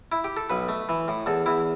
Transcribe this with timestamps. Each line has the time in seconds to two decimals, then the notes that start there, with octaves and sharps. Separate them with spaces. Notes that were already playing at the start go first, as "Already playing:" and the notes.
0.12 E4
0.24 G4
0.37 A4
0.50 B1 B4
0.69 A3
0.89 E3
1.08 A2
1.26 E2 A4
1.46 E2 E4